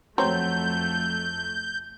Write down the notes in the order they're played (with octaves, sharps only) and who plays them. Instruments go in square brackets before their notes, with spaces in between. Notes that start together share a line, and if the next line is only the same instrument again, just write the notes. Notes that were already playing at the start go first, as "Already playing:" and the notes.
[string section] F2 A3 [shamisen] F#3 C4 [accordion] G6